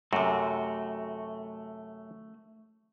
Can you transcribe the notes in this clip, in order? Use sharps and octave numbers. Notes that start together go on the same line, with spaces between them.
F#2 C3 A3 F#4